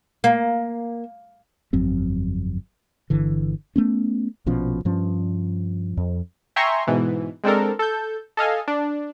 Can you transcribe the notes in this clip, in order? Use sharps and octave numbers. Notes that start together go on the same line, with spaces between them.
A#3
G1 F2 F#3 C4
G1 D3 E3
A3 B3 C#4
A#1 B2 F3 C#4
G2 F3 C#4
F2
E5 G5 G#5 A#5 C6 C#6
G#2 B2 E3
G#3 C4 D4 A4 A#4
A4 G6
A4 D#5 F5 G#5
D4